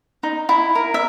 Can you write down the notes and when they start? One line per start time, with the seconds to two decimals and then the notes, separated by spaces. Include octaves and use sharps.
0.23 D#4
0.49 E4
0.75 A#4
0.94 E5